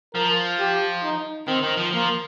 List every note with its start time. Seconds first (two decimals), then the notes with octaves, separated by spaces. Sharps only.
0.15 F3 A#4
0.60 G4
1.04 D#4
1.48 D#3 C4
1.64 D#3
1.78 F3
1.93 F3 A#3